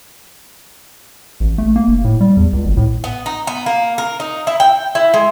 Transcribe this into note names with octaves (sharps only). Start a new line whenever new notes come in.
A1
A3
A#3
F1
A2
G3
E2
C#2
G#1
A2
B3
D#4
B3
A#3
A#4
D#4
E4
G5
E4
G#3